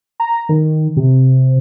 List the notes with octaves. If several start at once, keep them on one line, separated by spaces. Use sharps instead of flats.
A#5
D#3
C3